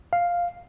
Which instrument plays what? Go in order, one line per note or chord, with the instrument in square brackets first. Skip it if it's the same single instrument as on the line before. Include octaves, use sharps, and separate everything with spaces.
[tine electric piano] F5